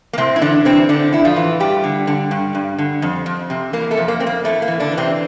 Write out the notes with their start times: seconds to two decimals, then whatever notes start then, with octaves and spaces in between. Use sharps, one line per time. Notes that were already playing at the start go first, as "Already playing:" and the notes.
0.13 A#3
0.18 A2 C3 C4
0.36 E4
0.42 D3 E3 D4
0.65 C3 E3 C4
0.89 A2 D3 D4
1.13 A2 E4
1.25 F3 F4
1.36 E3
1.60 G2 G3 G4
1.84 D3
2.07 D3
2.31 G2
2.55 G2
2.78 D3
3.02 F2
3.26 F2
3.50 C3
3.73 E3 A#3 A#4
3.91 A3 A4
3.97 F2
4.08 A#3
4.20 F2 C4
4.27 A#3
4.45 A2 A3
4.62 A#3
4.68 E3
4.80 D3 D4
4.92 E3
4.97 C3 C4